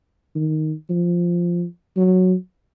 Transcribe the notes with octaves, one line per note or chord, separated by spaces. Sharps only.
D#3
F3
F#3